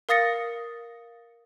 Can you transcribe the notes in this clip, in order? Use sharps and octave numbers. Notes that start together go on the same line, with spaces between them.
A#4 F5 D#6 A6 A#6 C#7